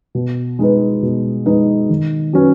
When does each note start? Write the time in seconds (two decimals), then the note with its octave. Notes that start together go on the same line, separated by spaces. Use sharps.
0.15 B2
0.59 G#3 D#4 B4
1.03 B2
1.45 G#3 D#4 B4
1.89 D#3
2.33 F#3 C#4 B4